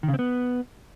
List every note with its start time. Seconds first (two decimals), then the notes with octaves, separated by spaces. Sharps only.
0.03 D#3
0.08 C#3
0.14 C4
0.19 B3